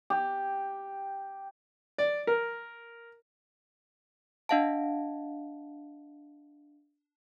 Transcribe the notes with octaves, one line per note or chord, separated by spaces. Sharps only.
G4
D5
A#4
D4 D#5 F5 F#5 A5